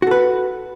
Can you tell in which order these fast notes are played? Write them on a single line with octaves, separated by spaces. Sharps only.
F#4 A4 B4